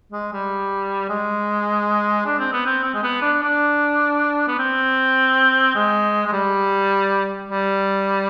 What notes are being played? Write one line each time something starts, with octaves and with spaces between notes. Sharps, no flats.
G#3
G3
G#3
D4
C4
B3
C4
C4
G#3
B3
D4
D4
B3
C4
G#3
G#3
G3
G3